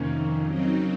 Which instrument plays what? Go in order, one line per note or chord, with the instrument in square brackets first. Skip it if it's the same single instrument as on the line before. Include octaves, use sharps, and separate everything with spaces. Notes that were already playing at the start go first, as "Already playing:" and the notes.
Already playing: [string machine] F2 C3 D#3 [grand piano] A#3 C#4
[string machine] C#3 F#3 C4 D#4